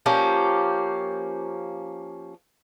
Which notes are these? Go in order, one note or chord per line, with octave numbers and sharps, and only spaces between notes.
F3 A#3 C#4 G4